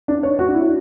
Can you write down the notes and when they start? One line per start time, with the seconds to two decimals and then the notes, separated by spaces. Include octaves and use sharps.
0.08 D4
0.23 C#5
0.39 F#4
0.48 D4
0.54 E4